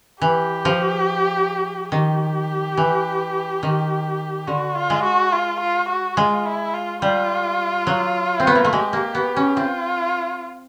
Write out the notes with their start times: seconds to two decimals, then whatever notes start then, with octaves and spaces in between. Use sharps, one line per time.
0.21 E3 G4
0.65 F3
1.91 D#3 G4
2.77 E3
3.63 D#3
4.47 D3 F#4
4.75 F4
4.90 G#3
5.04 F#4
5.32 F4
5.61 F4
5.89 F#4
6.17 G#3 F4
6.45 E4
6.74 F4
7.02 G3 F4
7.87 F#3
8.40 C4
8.47 B3
8.55 A#3
8.65 A3
8.72 G#3 G4
8.93 A#3
9.15 B3
9.36 C#4
9.57 C4 F4